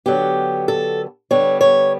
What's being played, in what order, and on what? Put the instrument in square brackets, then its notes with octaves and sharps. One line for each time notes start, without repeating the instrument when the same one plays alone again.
[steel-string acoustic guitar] D3 F#3 B3 G4
A4
D3 G3 B3 C#5
C#5